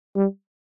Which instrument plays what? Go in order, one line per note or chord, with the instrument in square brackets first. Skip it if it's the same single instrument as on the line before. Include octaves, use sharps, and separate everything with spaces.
[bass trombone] G3